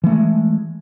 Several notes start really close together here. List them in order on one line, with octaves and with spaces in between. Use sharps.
E3 A3 G#3